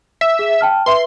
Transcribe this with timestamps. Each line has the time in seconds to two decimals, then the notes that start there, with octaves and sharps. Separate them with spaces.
0.21 E5 E6
0.39 G#4
0.61 G5 A5 F6
0.86 B4 E5 C6